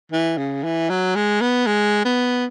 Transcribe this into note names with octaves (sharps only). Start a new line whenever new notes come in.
E3
C#3
E3
F#3
G#3
B3
G#3
B3